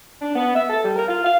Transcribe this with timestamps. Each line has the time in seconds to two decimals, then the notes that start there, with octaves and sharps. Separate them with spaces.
0.22 D4
0.36 B3
0.55 E5
0.70 A4
0.84 G3
0.96 A#4
1.08 F4
1.25 F5